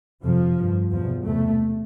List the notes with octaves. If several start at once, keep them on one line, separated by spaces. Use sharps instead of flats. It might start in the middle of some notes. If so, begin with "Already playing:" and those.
F2 C3 F3
G2
E2 B2 F3
E2 C3 A3